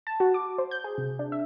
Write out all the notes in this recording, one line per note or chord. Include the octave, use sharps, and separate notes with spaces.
A5
F#4
D6
C5
G6
G#4
C3
D4
E5